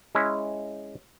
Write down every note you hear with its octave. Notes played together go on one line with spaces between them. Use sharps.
G#3 C#4 E4